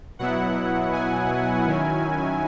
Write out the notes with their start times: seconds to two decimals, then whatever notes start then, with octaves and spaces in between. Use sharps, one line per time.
0.19 B2 F#3 B3 E4 F#5
0.93 G#5
1.67 D#3 F#3 C#4 E4